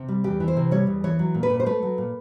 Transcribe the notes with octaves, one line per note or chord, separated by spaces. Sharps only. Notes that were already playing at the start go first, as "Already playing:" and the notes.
Already playing: C3
G3
E2 G4
E3
C5
C3
G3 C#5
E2
E3 C#5
F#3
A#2
B4
A#2
C5
A3 B4
F#3
A#2